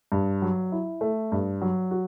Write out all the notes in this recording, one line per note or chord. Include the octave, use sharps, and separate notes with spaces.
G2
F#3
E4
A3
G2
F#3
F#4